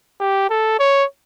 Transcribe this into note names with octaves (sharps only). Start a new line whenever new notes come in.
G4
A4
C#5